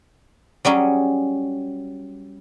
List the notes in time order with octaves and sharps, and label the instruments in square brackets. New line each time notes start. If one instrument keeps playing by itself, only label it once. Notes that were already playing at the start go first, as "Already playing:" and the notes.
[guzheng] F#3 G3 C#4 G#4